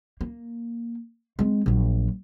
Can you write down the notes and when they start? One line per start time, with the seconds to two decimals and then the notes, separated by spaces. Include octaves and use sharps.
0.21 A#3
1.39 G#3 C4
1.66 A#1 F#3